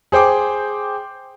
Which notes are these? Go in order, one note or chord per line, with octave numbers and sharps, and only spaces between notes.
G#4 C5 G5 D6